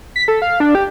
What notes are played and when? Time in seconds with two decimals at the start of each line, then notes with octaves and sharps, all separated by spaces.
0.16 B6
0.28 A4
0.42 F5
0.60 D4
0.75 G4